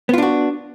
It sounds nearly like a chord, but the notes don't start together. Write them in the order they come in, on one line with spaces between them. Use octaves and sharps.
B3 F4 D4 F#4